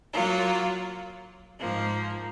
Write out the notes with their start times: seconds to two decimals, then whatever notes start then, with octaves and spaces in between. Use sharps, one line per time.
0.13 F#3 A#3 F4
1.59 G#2 F3 A#3